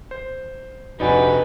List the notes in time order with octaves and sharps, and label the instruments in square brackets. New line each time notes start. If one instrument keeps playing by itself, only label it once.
[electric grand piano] C5
[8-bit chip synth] A#1 F2 C3 [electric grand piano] D#4 D5 G#5 [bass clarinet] F#4 [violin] B4